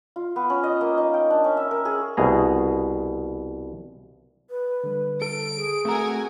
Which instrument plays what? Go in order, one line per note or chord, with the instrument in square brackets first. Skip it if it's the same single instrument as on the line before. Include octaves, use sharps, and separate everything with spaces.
[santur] F4
B3
C#4
D#5
A#3
D#4
G5
D4
C#4
E5
A#4
G#4
[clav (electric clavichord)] C2 B2 G#4 A#5
[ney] B4
[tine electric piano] D3 G3
[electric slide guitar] A4 [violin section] D7
[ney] G#4
[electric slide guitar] A3 E5 A#5 [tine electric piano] C4 [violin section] F#4 A#4 G#5